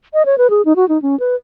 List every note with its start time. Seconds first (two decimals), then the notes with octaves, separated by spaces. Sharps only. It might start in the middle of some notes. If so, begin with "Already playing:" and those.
0.14 D#5
0.26 C#5
0.38 B4
0.50 G#4
0.65 D#4
0.76 F#4
0.89 D#4
1.02 C#4
1.20 B4